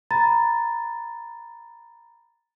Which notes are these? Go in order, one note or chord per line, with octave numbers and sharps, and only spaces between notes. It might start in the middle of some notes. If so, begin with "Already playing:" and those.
A#5 B5 A6